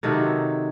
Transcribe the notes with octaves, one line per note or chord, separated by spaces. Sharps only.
C3 D#3 F#3 A4